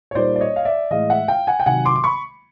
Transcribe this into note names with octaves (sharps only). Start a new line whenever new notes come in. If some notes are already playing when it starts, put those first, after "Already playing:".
C#5
A#2 G3 A#3 D#4 C5 D5
D5
C#5 D#5
F5
D5 E5
A2 E3 G#3 D#5 F5
E5 F#5
F5 G5
F#5 G#5
G5
C3 D#3 F#3 F#5 G#5
C6 D6
D6
B5 C#6